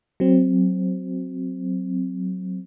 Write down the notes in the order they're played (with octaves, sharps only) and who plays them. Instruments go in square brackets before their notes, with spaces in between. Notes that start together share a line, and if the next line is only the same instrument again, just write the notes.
[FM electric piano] F#3 C4